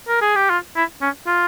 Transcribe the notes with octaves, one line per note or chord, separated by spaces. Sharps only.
A#4
G#4
G4
F4
E4
C#4
F4